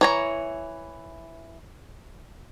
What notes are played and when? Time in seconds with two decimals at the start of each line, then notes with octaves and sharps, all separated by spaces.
0.01 E3 C#5 A#5